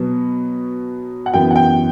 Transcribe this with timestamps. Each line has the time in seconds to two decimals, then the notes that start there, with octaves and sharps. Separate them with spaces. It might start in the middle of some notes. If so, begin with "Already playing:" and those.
Already playing: B2 F#3 B3
1.26 F#5
1.34 F#2 E3 B3 G5
1.51 F#5
1.56 G5